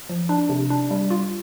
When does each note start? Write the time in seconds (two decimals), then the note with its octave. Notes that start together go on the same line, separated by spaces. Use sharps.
0.09 F3
0.29 D4
0.49 C3
0.70 D4
0.91 G3
1.10 F4